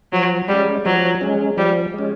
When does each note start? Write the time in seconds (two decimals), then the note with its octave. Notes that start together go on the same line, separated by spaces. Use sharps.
0.13 F3 F#3
0.48 G3 G#3 C#4
0.86 F3 F#3
1.21 G#3 C#4
1.57 F3 G3
1.94 G#3 C#4